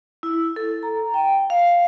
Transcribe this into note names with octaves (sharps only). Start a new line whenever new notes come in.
E4
A4
A#5
G5
F5